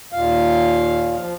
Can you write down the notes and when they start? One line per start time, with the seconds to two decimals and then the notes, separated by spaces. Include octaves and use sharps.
0.13 D#2 A#2 F5
1.16 F3